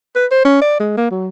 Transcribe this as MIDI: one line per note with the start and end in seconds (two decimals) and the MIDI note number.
0.15 0.26 71
0.31 0.41 72
0.45 0.61 61
0.62 0.78 74
0.80 0.95 56
0.97 1.09 58
1.11 1.28 54